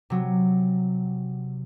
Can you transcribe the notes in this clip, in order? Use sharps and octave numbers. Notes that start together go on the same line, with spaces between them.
C3 F#3